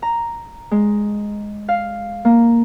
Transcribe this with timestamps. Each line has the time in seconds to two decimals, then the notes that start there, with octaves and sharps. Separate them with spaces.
0.02 A#5
0.71 G#3
1.68 F5
2.25 A#3